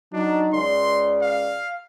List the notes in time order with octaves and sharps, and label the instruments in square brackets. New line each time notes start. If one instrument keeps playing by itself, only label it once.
[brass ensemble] F#3 D#4 [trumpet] D4
[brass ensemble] C#2 C#3 D5 [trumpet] C6
[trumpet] F5